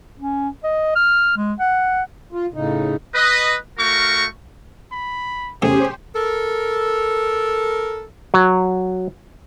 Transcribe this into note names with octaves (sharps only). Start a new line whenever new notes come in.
C#4
D#5
F6
G#3
F#5
F4
A2 C#3 D#4
B4 D#5
A3 F#4 A#4 F5 C#6
B5
E2 A2 C3 C#4 G4 G#4 C5
A4 A#4
F#3